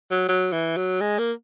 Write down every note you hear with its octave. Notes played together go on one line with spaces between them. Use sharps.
F#3
F#3
E3
F#3
G#3
A#3